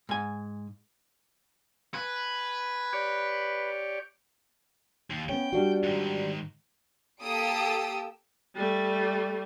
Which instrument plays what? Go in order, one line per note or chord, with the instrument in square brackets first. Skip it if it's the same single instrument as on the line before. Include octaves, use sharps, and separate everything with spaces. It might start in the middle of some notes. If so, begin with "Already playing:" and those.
[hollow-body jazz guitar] G#2 G#5
[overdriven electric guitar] B4 [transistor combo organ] G#5
[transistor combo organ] G4 C#5 D5
[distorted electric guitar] D#2
[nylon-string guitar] B3 C#4 [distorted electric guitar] G5
[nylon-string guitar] G3 D4 F#4
[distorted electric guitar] G#2 D#3
[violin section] A#3 G4 A4 D#6 E6 D7
[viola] G3 A3